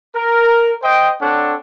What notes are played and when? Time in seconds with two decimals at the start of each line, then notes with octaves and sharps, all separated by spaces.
0.15 A#4
0.82 C5 D#5 G5
1.20 C4 D4 A4 C#5 F#5